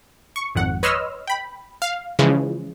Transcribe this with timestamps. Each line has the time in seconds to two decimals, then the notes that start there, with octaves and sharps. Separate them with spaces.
0.36 C#6
0.55 G#1 F2 F#5
0.83 B4 C#5 D#5 C6 E6 F6
1.27 G5 B5
1.82 F5
2.19 C#3 E3 F3 G#3